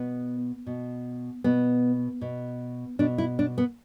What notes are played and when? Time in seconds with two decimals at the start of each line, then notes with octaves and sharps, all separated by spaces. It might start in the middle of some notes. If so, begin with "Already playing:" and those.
Already playing: B2 B3
0.67 B2
1.44 B2 B3
2.21 B2
2.99 B2 D4
3.18 E4
3.39 D4
3.58 B3